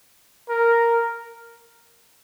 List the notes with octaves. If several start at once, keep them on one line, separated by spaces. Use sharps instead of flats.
A#4